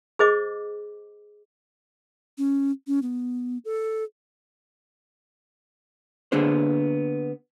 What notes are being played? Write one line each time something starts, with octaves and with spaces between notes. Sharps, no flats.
G#4 C5 D#5 D6
C#4
C#4
B3
A4
D3 A#3 B3 D4 G#4 C5